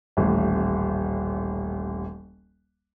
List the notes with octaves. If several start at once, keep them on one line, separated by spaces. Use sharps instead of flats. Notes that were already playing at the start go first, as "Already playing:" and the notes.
D#1 A1